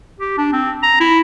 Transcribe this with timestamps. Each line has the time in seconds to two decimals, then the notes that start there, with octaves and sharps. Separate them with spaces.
0.19 G4
0.38 D4
0.53 C4
0.83 A#5
1.00 E4